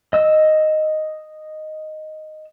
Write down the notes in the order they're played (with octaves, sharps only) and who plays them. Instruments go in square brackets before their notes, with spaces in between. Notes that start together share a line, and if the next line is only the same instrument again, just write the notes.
[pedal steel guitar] D#5 E6